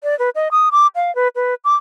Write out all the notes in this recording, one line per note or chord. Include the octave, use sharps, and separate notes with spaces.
D5
B4
D#5
D#6
D6
F5
B4
B4
D6